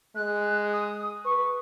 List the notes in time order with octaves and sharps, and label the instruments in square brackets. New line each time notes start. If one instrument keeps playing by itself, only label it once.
[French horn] G#3 [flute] F#6
[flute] D#6
[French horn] B4 [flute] C#6